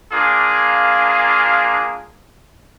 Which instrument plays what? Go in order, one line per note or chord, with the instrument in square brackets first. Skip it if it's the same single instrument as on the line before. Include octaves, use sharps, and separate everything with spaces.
[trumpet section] A#3 D4 F4 G#4